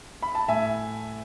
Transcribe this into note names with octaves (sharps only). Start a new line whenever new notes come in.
B5
A5
A2 E5 G#5